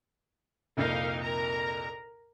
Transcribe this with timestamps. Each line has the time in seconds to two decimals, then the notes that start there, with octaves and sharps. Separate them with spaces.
0.77 C2 F2 A#2 D#4 A#4 F5
1.21 A#4 A#5